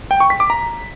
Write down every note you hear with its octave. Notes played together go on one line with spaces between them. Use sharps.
G5
C#6
B6
D6
A#5